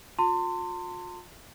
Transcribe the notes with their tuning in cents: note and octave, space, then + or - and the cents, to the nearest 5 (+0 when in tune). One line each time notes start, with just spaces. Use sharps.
F4 +40 A5 +40 C6 -5